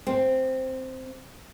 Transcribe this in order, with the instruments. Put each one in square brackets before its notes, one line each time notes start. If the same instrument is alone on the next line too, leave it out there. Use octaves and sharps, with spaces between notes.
[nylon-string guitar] C4